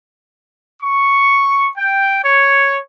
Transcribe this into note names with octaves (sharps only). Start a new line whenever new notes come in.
C#6
G5
C#5